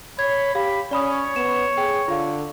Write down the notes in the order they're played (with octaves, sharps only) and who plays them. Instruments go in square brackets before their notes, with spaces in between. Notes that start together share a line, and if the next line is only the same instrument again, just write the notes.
[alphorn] C#5 [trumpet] B5 [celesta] G#6
[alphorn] G4 [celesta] F5 [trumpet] B5
[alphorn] C#4 [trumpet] C#5 [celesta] D5 B5 D#6
[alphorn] B3 [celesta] E7
[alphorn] G#4 [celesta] G5
[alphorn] D3 [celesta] F4 F5